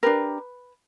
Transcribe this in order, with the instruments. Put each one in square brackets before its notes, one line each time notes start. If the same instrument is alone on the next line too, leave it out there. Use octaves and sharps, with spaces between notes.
[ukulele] D4 G4 A#4 B4